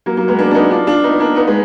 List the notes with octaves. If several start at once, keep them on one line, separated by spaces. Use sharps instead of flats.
F#3 A#3
F#3 A#3
G#3 B3
A#3 D4
D4
B3 D#4
D4 F4
D4 F4
B3 D#4
A#3 D4
B3 D#4
G#3 B3